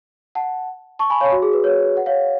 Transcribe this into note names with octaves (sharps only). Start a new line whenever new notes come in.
F#5 A5
A5 C#6
G#5 B5
C#5 F5
F#4
G#4
B4
C#5
F#5
C#5 F5